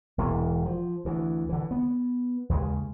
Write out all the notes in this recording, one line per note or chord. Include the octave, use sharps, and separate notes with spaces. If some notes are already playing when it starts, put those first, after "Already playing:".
E1 E2 G#2 E3
F3
D2 E3
D3 E3
B3
D#2 C#3 G#3